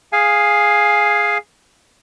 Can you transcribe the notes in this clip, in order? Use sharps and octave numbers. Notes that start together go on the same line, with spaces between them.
G#4 F5 G#5